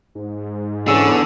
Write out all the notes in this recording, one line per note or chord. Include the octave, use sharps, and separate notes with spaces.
G#2
E2 D3 C#4 E6